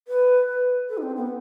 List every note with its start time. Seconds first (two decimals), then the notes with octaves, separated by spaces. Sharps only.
0.08 B4
0.49 B4
0.89 A4
0.98 D#4
1.03 C4
1.17 B3